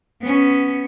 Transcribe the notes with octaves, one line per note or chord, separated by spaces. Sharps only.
B3 C#4